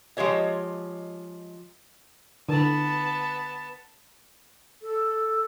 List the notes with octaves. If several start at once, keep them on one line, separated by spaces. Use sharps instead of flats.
F3 G#3 G4 C#5 D#5
D3 B3 A5
A4